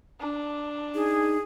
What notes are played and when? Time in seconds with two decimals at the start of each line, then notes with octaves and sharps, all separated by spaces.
0.20 D4
0.95 D#4 G#4